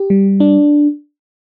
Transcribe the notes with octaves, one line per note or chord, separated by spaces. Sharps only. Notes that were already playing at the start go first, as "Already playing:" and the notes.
Already playing: G4
G3
D4